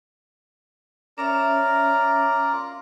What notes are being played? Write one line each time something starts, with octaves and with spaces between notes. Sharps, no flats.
C#4 A#4 C#5 D5 E5 A#5
F4